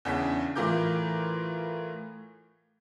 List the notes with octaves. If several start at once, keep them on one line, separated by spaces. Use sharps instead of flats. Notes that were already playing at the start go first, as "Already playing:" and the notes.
E2 C#3 D4 B6
A2 E3 F4 A#4 D6 G6